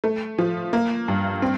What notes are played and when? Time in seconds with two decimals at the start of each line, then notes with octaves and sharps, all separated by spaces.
0.04 A3
0.38 F3
0.73 A#3
1.08 G2
1.42 C4